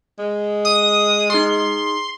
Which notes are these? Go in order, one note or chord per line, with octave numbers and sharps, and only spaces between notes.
G#3
D#6
D#4 G#4 C6